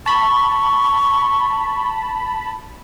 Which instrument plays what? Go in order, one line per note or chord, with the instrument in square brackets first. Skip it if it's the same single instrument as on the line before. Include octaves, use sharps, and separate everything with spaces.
[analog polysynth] A5 B5 [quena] C#6